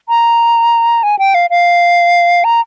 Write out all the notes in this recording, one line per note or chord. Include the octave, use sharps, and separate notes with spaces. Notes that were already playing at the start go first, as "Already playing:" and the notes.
A#5
G#5
G5
F5
F5
A#5